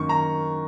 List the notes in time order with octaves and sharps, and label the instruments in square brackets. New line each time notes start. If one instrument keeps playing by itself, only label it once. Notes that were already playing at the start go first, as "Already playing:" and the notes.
Already playing: [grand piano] F#2 D#3 A#3 C#6
A#5